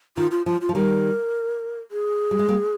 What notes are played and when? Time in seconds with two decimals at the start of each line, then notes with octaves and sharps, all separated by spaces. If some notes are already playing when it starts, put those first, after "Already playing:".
0.17 D#3 F4
0.31 F4
0.46 F3 F4
0.61 F4
0.69 F3
0.75 D#3 G3 A#4
1.91 G#4
2.31 G3
2.39 G#3
2.48 G3 A#3